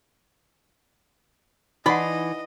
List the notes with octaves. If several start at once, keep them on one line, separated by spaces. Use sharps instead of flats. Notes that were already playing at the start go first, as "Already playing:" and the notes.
E3 D#4 D5 D#5 F#5 B5 C6